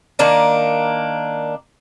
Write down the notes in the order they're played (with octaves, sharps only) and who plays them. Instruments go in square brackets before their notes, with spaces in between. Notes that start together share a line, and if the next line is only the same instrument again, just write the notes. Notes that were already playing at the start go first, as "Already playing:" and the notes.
[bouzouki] D#3 A#3 D4 D#4